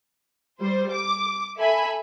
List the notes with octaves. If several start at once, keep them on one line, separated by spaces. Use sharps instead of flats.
G3 C5
D6
A4 E5 G#5 B5